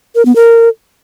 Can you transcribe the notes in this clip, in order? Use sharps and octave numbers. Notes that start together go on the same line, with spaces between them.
A#4
B3
A#4